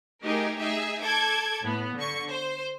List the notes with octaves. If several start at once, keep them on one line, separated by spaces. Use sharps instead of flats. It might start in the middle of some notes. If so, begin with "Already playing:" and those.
A3 D#4 G4 G#4 A#4
D#4 G#4 E5
A4 D6 G#6
A2 B3
D3 C#6
C5